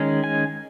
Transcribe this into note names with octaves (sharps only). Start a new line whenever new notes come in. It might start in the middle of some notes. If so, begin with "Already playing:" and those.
Already playing: D#3 G#3 C#4
G#5